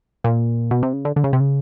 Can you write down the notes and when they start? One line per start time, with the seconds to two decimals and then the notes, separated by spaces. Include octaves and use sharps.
0.24 A#2
0.71 B2
0.83 C3
0.93 C#3
1.05 D3
1.16 D3
1.24 C#3
1.33 C3
1.40 C#3